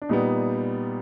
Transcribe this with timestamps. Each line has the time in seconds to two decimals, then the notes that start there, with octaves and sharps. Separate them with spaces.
0.02 D4
0.09 A#2 G3 B3 D#4